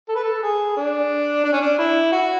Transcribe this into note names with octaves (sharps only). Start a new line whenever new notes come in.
A4
B4
A4
G#4
D4
D4
C#4
D4
E4
F#4